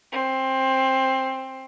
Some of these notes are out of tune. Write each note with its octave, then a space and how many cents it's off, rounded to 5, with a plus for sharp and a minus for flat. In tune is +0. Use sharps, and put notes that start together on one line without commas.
C4 +15